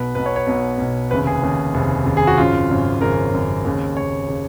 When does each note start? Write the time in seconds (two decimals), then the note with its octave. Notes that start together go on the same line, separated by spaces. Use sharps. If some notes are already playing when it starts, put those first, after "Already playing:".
Already playing: B1 B2 B4
0.15 B1 B2 B4
0.26 C#5
0.36 C#5
0.47 B1 B2
0.78 B1 B2
1.11 F1 D#2 C#3 B4
1.27 G#4
1.42 F1 D#2 C#3
1.74 F1 D#2 C#3
2.06 F1 D#2 C#3
2.17 G#4
2.27 F#4
2.37 G#1 F#2 C#3 F4
2.70 G#1 F#2 C#3
3.01 G#1 F#2 C#3 A#4
3.33 G#1 F#2 C#3
3.64 D#2 C#3
3.97 D#2 C#3 C#5
4.29 C#3